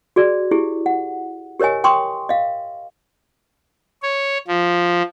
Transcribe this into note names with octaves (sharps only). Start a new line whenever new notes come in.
F#4 G#4 D5
E4 G4 G#4
F#5
G4 A#4 C#5 D#5 G#5
G5 C6 C#6 D#6
D#5 F5
C#5
F3